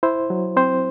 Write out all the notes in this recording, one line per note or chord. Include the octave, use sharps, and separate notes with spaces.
E4 C5
F#3
C4 C5